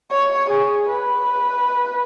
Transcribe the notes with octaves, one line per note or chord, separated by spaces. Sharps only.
C#5
G#4
B4